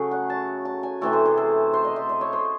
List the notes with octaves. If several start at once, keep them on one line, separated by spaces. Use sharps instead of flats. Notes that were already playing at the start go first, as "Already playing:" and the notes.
Already playing: C#3 F#3 A3 G#4
F#5
A5
A5
G#5
C3 E3 A3 A4
C5
G#4
A4
C5
D#5
E5
D#5
C#5
C5